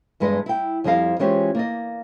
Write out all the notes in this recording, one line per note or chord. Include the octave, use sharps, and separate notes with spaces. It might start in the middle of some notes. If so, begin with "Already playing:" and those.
E2 G2 G#3 B4 D#5
E4 G5
F2 F3 G3 E4 D#5 F5
E3 G#3 C#4 F4 G4 C5
A#3 D5 D#5